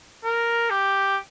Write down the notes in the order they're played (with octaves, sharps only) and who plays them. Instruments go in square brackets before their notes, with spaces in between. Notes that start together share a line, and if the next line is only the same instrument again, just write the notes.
[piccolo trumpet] A#4
G4